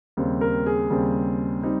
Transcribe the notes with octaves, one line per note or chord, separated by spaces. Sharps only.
D#2 C#3 G3 C4
A#4
G#4
D#2 C#3 G3 C4
G3 C4 D#4